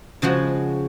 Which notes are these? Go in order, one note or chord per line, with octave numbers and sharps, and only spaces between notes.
C#3 F3 G#3 F#4